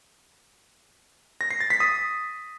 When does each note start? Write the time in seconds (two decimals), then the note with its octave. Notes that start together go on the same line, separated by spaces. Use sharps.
1.41 A#6
1.51 C7
1.60 A6
1.70 B6
1.80 D#6